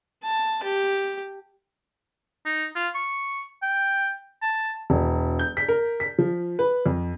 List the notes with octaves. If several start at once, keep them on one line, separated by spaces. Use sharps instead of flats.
A5
G4
D#4
F4
C#6
G5
A5
E1
G6
B6
A#4
B6
F3
B4
F2